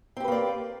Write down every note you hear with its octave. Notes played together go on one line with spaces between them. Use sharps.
A#3 C4 G4 B4 D5